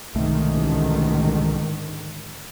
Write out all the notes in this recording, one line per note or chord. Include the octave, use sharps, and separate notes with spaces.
C2 G#2 B2 D3 D#3 A3
A1